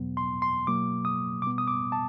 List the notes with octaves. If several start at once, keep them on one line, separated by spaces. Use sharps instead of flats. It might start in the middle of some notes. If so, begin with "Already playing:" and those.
Already playing: E2 B2 F#3 B3
C6
C6
B2 F#3 A#3 D6
D#6
B2 G3 B3 D6
D#6
D6
A5